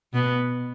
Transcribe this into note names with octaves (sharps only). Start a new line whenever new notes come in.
B2 B3